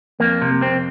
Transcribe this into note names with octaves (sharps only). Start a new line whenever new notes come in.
F2 A#3
C3
F2 C4